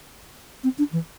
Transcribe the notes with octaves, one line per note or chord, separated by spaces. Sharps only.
C4
D4
E3